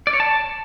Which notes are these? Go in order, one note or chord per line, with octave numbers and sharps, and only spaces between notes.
D5
C#5
A5